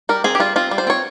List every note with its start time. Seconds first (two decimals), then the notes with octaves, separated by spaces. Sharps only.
0.09 G3 A#4
0.24 C4 G#4
0.35 G4
0.40 G3 F4
0.56 C4 F4
0.71 G3
0.78 C5
0.87 C4 C#5